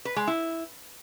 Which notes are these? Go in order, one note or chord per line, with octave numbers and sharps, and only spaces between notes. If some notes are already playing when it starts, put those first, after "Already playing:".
B4
G#3
E4